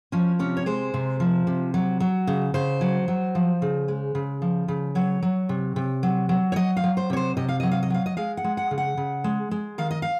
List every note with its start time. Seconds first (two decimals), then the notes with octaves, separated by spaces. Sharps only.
0.12 F3 C#4
0.39 C3 C#4
0.57 C#5
0.66 G#3 C5
0.94 C3
1.20 F3
1.47 C3
1.74 F#3
2.00 F#3
2.27 C#3
2.54 C#3 C5
2.81 F#3
3.08 F#3
3.35 F3
3.62 C#3
3.88 G#3
4.15 C#3
4.42 F3
4.68 C#3
4.95 F#3 C#5
5.22 F#3
5.49 C3
5.76 C3
6.03 F#3
6.29 F#3
6.52 C#5
6.56 F#3 D#5
6.77 F5
6.84 F#3
6.97 C5
7.10 C3 C#5
7.17 C5
7.37 C3 D#5
7.49 F5
7.60 F#3 D#5
7.71 F5
7.83 D#5
7.90 F#3 F5
8.06 D#5
8.17 G#3 F5
8.37 F#5
8.44 G#3
8.57 F#5
8.71 C#3
8.78 F#5
8.97 C#3
9.24 G#3
9.51 G#3
9.78 D#3 F5
9.91 D#5
10.02 F5